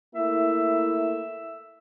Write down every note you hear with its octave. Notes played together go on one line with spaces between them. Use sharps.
A3 A#3 E4 E5